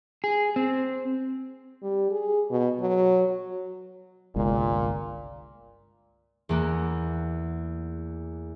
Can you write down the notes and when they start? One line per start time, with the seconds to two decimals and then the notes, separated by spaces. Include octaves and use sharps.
0.24 G#4
0.56 C4
1.82 G3
2.11 G#4
2.51 B2
2.80 F#3
4.36 G1 C2 A#2 G#3
6.49 E2 A#3 F#5